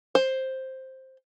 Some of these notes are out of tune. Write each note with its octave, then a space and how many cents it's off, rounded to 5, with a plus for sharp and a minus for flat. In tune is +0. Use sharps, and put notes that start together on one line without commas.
C5 +5